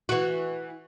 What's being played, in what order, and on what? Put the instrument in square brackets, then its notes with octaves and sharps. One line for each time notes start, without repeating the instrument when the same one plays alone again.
[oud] E3 F#4